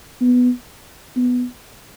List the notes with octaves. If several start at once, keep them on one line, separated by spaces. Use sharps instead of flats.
B3
B3